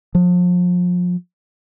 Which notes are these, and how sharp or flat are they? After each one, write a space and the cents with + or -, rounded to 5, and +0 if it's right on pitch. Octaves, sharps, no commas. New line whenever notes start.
F3 +35